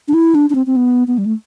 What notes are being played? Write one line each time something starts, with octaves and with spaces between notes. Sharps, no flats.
D4
E4
D4
D4
C4
C4
B3
B3
G3
A3